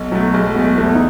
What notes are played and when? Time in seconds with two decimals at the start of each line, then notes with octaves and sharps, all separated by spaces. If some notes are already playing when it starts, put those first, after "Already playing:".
Already playing: B1
0.12 B2 F#3 A3
0.34 B1 G#3
0.55 B2 G#3 A3
0.78 E2 A3
0.95 D#4